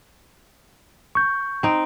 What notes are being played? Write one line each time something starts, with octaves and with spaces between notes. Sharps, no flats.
C#6 G6
C4 D#4